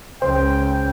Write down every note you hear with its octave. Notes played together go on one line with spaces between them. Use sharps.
C#2 C5 G5